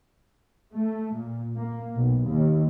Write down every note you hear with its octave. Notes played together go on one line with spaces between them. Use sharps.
A3
A#2
A#3
B1
D#2